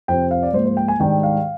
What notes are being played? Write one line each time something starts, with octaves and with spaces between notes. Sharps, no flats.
F2 C3 F3 C4 G5
F5
D5
G#2 F3 A#3 C5
C5
G5
G#5
G#2 D#3 G3 D4 G5
F5